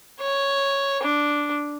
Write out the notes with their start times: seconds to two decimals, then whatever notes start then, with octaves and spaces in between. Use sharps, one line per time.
0.21 C#5
1.03 D4